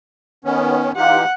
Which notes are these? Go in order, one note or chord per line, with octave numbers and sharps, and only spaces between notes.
D#3 B3 C#4
E3 D#4 F4 G4 F#5